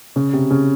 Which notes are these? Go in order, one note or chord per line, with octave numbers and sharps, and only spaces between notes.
C#3
C3
C#3